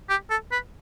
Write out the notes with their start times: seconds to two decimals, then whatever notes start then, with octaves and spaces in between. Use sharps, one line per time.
0.09 G4
0.30 A4
0.52 B4